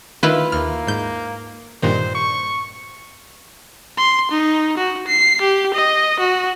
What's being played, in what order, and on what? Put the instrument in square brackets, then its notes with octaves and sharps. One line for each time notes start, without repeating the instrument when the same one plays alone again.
[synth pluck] D#3 [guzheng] E4 F4 B4
[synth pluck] D#2 F6 [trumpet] A#3
[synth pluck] G#2 G6
[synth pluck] G2 A#2 D#3 [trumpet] C5
[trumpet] C#6
[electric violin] C6
D#4
F#4
C7
G4
D#5
F#4